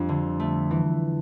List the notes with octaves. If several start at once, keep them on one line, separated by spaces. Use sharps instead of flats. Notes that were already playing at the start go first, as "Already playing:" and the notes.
Already playing: F2 G3 D4
D3
A3
E3